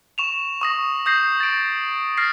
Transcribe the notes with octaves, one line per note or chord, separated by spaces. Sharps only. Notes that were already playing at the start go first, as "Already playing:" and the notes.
C#6 E7 F7
C#6 D#6 A#6
D#6 G6 A#6 C7
A6 D7
F6 A6 A#6 C7